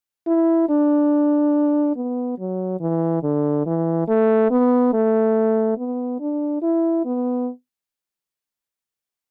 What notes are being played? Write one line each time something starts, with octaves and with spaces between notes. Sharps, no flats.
E4
D4
B3
F#3
E3
D3
E3
A3
B3
A3
B3
D4
E4
B3